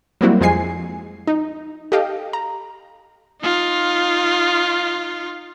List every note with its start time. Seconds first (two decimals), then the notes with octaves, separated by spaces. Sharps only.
0.21 F#3 G3 A#3 C4 E4 F#4
0.41 F2 F3 G#3 G#5 C7
1.27 D#4
1.92 G4 A4 D#5 F5 G5
2.33 A#5
3.41 D#4 F4